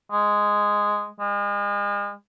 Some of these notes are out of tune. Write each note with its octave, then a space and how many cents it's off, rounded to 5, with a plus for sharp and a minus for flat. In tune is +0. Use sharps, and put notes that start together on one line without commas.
G#3 -5
G#3 -35